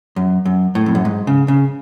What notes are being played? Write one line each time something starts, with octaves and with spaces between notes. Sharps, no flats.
F#2
F#2
A2
F2
F#2
G#2
C#3
C#3